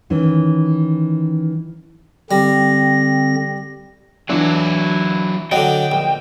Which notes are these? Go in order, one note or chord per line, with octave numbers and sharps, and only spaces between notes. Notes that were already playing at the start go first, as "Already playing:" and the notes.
D#3 E3 C#4
D3 G3 C4 A#6
E3 F#3 D4 E4
D3 F#3 D#5 G5
A#1